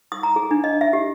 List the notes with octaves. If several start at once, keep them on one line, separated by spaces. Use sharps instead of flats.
D#6
A#5
G#4
D4
D#5
E5
G4